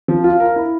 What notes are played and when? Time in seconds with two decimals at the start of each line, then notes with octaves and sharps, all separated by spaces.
0.08 F3
0.24 F4
0.40 A#4
0.56 E4